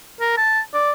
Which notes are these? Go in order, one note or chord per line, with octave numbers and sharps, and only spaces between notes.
A#4
A5
D5